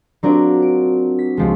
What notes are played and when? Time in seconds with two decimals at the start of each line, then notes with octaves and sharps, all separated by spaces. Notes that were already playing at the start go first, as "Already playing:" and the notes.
0.23 F#3 C4 D4 F4 A#4
0.62 D7
1.19 B6
1.37 C#2 F3 G#3